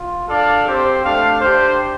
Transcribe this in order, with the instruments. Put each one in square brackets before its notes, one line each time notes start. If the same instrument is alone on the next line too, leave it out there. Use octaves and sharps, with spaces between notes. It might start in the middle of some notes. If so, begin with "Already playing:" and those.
Already playing: [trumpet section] F4
D4 A4 D5 F5
C4 G4 C5
A3 D4 A4 F5
D4 G4 C5